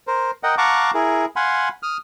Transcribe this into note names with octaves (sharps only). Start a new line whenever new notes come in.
A#4 C5
A#4 D#5 F#5 G5
F5 F#5 A5 A#5 C#6 D6
E4 G#4 A#4
F5 F#5 G#5 B5 C6
D#6 F6